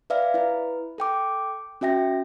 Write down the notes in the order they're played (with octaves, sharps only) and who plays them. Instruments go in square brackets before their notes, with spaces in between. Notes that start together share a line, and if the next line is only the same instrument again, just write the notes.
[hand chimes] B4 D5 E5 F5
E4 B4
A4 G5 D6
C#4 F#4 E5 G5 A#6